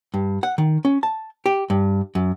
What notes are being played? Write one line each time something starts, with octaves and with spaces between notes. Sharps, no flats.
G2
F#5
D#3
C#4
A5
G4
G2
F#2